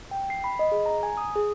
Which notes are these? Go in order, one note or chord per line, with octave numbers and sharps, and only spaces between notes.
G5
C7
B5
D#5
G#4
A#5
G#5
D#6
G#4